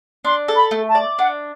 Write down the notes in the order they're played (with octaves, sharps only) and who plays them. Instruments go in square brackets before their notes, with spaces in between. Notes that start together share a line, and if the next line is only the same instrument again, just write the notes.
[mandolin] D4 [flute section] C6
[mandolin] A4
[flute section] B5
[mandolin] A3
[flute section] A5
[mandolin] D5
[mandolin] D4 [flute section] F#5